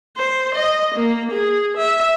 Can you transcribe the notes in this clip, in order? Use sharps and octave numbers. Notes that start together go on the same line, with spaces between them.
C5
D#5
A#3
G#4
E5